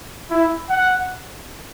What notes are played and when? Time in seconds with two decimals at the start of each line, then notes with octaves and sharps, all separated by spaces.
0.30 E4
0.69 F#5